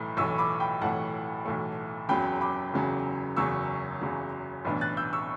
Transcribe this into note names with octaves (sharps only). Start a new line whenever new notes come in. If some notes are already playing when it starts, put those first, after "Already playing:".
Already playing: B1 A2 E3 A3
B1 A2 E3 A3 C#6 E6
B5 D6
G5 B5
B1 A2 E3 A3 F#5 A5
B1 A2 E3 A3
F#1 E2 C#3 F#3 G5 B5
B5 D6
F#1 E2 C#3 F#3
F#1 E2 C#3 F#3 C#6 E6
F#1 E2 C#3 F#3
B1 A2 E3 B3 D4
F#6 A6
E6 G6
C#6 E6